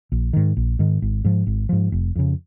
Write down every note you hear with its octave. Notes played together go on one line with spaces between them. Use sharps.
A#1
G#2 D#3
A#1
G#2 D#3
G#1
G#2 F3
G#1
G#2 F3
F1
F2 C#3